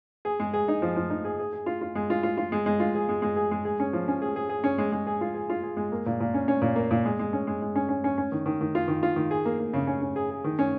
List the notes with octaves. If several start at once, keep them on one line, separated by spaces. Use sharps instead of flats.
G#4
G#3
G#4
D#4
F3
F3
D#4
G#4
G#4
G#4
F4
F4
G#3
F4
F4
F4
G#3
G#3
F4
G#4
G#3
G#3
G#4
G#3
G#4
C#4
F3
C#4
G#4
G#4
G#4
C#4
G#3
G#3
G#4
F4
G#4
F4
G#4
G#3
A#3
A#2
A#2
C#4
C#4
A#2
A#3
A#2
G#3
G#3
C#4
G#3
G#3
C#4
C#4
C#4
C#4
D#3
D#3
D#3
F4
D#3
F4
D#3
G#4
A#3
A#3
C#3
C#4
C#4
G#4
G#4
D#3
C#4